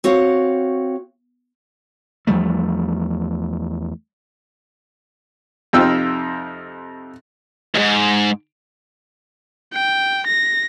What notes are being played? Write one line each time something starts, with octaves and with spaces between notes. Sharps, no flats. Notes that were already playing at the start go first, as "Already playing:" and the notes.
C4 F#4 C#5 F5 F#5
E2 F3 G3 A3
F2 C3 D#4 F4 G5 E6
D#2 G#2
G5
A#6